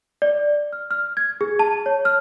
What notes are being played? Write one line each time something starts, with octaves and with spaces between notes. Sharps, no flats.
D5
F6
F6
G#6
G#4
A5
C#5
F6